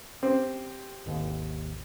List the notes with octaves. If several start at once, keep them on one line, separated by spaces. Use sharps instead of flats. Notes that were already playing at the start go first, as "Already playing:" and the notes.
C4 G4
G#1 D#2